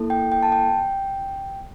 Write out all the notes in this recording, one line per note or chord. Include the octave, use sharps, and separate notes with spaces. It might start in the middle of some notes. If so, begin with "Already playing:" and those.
Already playing: A#3 E4 A4
G5
G5
A5
G5